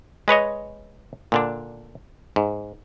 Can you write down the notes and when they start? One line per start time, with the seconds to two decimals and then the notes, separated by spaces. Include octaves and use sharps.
0.28 G#3 B4 C#5 D#5
1.32 A#2 D3 D4
2.36 G#2